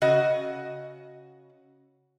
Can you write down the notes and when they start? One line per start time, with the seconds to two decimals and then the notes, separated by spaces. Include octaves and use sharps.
0.02 C#3 F#4 D#5